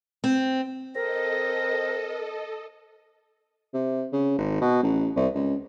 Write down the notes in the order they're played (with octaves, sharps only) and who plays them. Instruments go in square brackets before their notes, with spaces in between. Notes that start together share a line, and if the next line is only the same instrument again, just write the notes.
[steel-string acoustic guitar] C4
[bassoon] C4 [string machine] A4 D#5 [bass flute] A#4 [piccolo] A#6
[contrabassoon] C3
C#3
G#1
B2
A1
C2
C#2